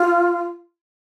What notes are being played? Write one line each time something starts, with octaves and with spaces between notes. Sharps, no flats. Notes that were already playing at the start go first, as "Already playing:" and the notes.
Already playing: F4